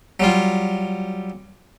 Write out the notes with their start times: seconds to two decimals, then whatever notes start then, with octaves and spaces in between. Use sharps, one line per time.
0.20 F#3 G3 F4